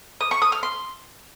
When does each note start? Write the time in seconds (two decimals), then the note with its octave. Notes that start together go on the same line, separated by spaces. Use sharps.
0.21 D#6
0.31 C#6
0.42 D#6
0.52 F6
0.63 C6